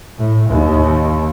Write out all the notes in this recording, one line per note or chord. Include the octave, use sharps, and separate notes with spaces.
A2
D#2